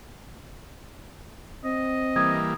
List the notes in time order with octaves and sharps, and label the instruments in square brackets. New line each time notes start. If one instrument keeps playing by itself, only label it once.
[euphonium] C4 [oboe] D#5
[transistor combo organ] E3 G3 A#3 [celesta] D#6 G#6